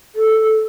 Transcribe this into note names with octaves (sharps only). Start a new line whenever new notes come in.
A4